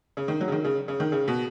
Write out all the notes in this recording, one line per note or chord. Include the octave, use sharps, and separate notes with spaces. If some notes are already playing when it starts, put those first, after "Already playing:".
C#3
D#3
F#3
C#3
D#3
C#3
C#3
D#3
C#3
B2